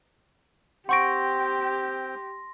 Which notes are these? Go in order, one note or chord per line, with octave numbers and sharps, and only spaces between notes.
C4 G4 F#5 G5 C6 C#6 A#6 D7